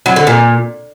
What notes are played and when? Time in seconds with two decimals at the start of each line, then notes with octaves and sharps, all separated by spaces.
0.06 F#3
0.16 D3
0.27 A#2